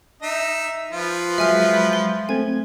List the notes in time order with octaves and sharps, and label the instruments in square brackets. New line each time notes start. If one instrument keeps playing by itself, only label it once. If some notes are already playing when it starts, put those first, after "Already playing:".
[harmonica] D#4 E5
F3 F4 B4
[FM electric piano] F#3 G#3 [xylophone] E5 G#5 F6
[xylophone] C6
[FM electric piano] A3 C4 G#6 [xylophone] G#5